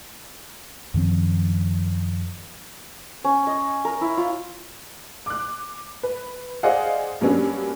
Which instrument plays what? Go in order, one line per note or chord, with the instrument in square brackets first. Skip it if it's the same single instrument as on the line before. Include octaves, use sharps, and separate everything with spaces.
[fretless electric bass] F#2 D#3 F3 C4
[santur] C#4
D#5
A#4
E4
F4
[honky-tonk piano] D6 F#6
B4
G#4 C5 D5 D#5 F5 F#5
G2 F#3 A#3 B3 C#4 D4